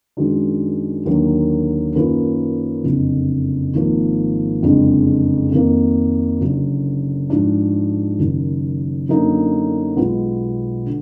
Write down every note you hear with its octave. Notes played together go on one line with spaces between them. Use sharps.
F#2 D#3 G#3 D4 F#4
D#2 D3 F#3 A#3 D4
F#2 D#3 A#3 F4 B4
F#1 F2 D3
G#1 G#2 F3 A#3
F#1 F2 D3 G#3 D4
F2 D#3 A#3
F#1 F#2 D3 F#3
G#2 F3 G#3 D4
F#1 F#2 D#3 F#3
F#2 D3 F#3 A#3 D#4
B1 B2 G#3 B3 F4
D3